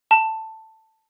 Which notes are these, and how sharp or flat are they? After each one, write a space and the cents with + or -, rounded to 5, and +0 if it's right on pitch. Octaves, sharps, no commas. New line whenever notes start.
A5 +10